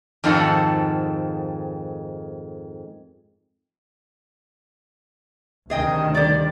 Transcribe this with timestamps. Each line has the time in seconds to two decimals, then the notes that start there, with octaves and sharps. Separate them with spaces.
0.24 F2 G#2 D#3 F4 A4 F#5
5.70 D2 C3 D#3 G#4 D#5 G5
6.14 G3 D5